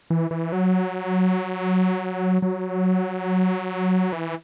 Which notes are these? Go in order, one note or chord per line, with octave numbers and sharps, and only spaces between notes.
E3
E3
F#3
F#3
E3